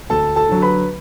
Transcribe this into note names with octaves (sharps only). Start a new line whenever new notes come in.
D2 A4 A5
A4 A5
D3 F#3
B4 B5